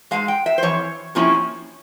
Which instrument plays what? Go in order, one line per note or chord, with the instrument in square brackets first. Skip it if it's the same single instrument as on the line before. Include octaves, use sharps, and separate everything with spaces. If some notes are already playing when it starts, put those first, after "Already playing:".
[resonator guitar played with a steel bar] G#2 E3 G#3 F5
G5
E5
C5
F2 E3 C#5
C3 F3 A#3 C#4 E4